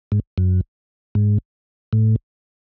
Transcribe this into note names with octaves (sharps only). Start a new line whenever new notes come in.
G#2
F#2
G#2
A2